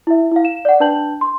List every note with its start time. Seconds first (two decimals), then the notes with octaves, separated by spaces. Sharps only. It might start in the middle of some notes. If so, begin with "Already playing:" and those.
0.07 E4 E5
0.32 E4 F5
0.45 E7
0.65 D5 F#5
0.80 D4 B4 A5 G6 F#7
1.21 C6